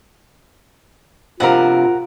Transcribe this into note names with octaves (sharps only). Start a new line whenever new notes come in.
G2 C3 F3 F4 A#4 F#5